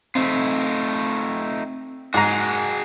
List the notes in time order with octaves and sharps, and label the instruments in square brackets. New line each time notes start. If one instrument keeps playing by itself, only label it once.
[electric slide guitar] A3 D#4 F4 [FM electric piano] C4
[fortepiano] G#2 A#5 [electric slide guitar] F#4 G#4